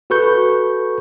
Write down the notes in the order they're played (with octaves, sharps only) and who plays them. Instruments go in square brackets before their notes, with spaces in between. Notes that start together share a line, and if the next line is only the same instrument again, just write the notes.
[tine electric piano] F#4 A4 B4 C#6 G6